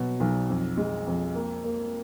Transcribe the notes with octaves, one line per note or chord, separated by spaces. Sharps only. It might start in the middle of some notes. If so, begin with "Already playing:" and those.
Already playing: B2 F#3
B1
F2
G#3
F2
A#3
A#3